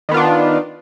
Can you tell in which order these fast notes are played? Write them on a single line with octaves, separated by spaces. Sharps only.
D#3 B3 F4 D4